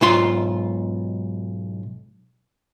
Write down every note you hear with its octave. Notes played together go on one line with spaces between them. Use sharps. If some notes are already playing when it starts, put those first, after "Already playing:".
B1 G#2 F4 C6